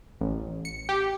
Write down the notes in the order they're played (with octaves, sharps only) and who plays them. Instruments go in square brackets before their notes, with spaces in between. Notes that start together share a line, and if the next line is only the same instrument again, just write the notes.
[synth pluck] A1
C#7
G4